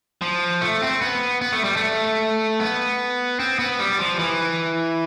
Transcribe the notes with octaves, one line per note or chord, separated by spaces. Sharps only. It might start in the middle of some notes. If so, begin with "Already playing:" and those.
F3
A3
C4
B3
B3
A3
G3
A3
B3
C4
B3
G3
F3
E3